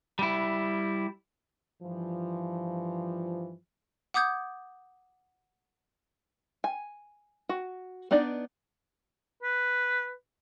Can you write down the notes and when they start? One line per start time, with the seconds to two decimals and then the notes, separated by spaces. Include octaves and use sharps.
0.19 G3 E4
1.83 G2 E3 F3
4.14 F#5 D6 D#6 G6 G#6
6.64 G#5
7.49 F#4
8.11 B3 D4 D#4 D5
9.43 B4